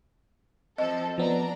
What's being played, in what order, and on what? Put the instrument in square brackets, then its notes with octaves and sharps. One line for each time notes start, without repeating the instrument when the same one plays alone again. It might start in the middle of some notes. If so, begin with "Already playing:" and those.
[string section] F3 C4 A4 [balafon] D#5
[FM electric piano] F3 B3 [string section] D4 A#5